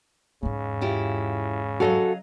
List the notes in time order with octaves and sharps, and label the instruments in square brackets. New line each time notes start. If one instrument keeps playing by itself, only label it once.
[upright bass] E2 G#2 [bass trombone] C#3
[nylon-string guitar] E4 F4 G4
[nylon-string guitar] F#3 D#5 F5 [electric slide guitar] F#4 A4